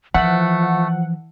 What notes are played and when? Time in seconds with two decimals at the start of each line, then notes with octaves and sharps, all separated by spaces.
0.14 E3 F3 A3 F#5